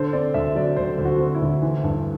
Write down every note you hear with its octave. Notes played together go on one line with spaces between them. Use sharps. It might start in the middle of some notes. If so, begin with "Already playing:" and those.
Already playing: D3 C5
C4 D5
D2 E5
F#3 D5
D2 C5
D2
F#4
C4
E4
D2
E3
G2